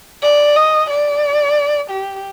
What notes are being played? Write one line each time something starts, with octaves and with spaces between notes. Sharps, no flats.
D5
D#5
D5
G4